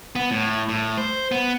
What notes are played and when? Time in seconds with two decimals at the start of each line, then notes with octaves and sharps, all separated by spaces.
0.16 B3
0.31 A2
0.69 A2
0.97 C5
1.32 B3